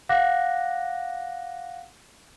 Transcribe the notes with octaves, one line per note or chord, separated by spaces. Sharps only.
F5 F#5 D6 F#6 A#6